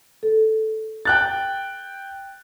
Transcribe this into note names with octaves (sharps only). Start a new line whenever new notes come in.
A4
G5 F#6 A6